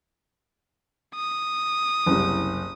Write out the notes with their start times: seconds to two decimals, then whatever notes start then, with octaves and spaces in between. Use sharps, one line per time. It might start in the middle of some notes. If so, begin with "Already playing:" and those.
1.15 D#6
2.06 F#1 C2